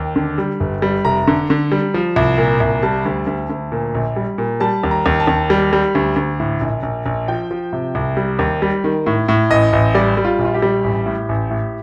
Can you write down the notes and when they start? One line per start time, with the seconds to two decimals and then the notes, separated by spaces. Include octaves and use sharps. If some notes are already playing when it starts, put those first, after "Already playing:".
Already playing: D#2 G5
0.16 D3
0.38 G3
0.60 G1
0.82 G3
1.05 F1 A#5
1.27 D3
1.50 D3
1.72 G3
1.94 F3
2.16 C2
2.38 A#2
2.60 C2
2.82 G3 A5
3.06 D2
3.27 D2
3.50 D2
3.72 A#2
3.95 A#1
4.16 G3
4.38 A#2
4.60 G3 A5
4.84 D#2
4.91 A#5
5.06 D#2
5.20 A5
5.27 D#2
5.50 G3
5.73 G3
5.95 D2
6.16 D2
6.40 A2
6.61 A#1
6.83 A#1
7.06 A#1
7.28 F3 G5
7.51 F3
7.73 C3
7.95 C2
8.17 G3
8.39 D#2
8.62 G3
8.84 D#3
9.06 A2
9.28 A2
9.51 A1 D#5
9.73 A1
9.95 G3 D5
10.17 G3
10.25 F4
10.39 A#1
10.45 F4
10.54 G4
10.62 G3
10.84 A1
11.06 A2
11.29 A1
11.50 A2